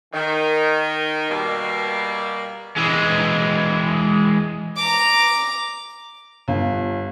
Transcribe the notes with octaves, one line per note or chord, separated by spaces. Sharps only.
D#3
B2 G3 A#3
E3 G#3
A#5 D6
G1